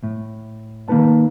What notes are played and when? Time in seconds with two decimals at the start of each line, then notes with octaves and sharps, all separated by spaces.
0.03 A2
0.88 D#3 A#3 C#4 D#4 B4 A5